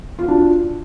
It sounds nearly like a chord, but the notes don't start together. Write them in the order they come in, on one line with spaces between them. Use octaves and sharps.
F4 F#4 D4